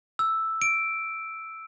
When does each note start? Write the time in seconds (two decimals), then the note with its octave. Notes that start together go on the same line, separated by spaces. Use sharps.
0.19 E6
0.62 D7